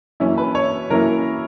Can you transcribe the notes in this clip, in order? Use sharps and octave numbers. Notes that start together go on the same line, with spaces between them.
F#2 E3 A#3 C#4 E4
B4
C#5
F#2 E3 A#3 C#4 E4 A#4